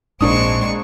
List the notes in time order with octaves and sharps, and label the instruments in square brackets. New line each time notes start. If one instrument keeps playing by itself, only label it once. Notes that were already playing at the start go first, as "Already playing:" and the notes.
[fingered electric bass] A#1 G#2 [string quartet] G#3 C4 C#6 [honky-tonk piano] A#3 D4 D#6